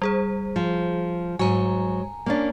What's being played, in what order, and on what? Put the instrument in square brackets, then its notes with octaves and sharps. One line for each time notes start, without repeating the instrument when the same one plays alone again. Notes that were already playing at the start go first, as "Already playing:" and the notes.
[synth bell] G3 G#4 C5
[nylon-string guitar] F3
[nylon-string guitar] G#2 F#3 [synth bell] G#5 A#5
[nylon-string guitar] A#3 C#4 D4